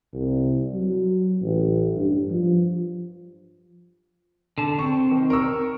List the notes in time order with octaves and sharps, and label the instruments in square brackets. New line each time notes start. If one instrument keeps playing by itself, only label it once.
[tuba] C2
F#3
A1
G2
F3
[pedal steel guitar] D3 A5
[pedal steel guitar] C4 [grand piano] C#6
[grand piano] D#3
A#4 C#6 E6